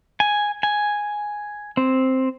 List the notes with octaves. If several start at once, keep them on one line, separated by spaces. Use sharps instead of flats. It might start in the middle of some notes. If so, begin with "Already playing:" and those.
G#5
G#5
C4